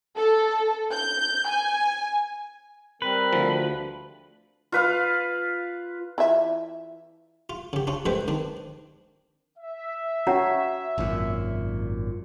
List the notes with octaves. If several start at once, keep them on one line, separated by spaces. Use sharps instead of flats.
A4
G6
G#5
G3 C4 A#4 B4
D2 F3
F4 B4 F5
E3 F4 E5
F4
C#3 G4
C#4 D4 F4
A1 C3 G#3 C4 B4 G5
D#3 C4 D4
E5
C#4 F#4 C#5 F#5 A#5
G#1 F#2 A#2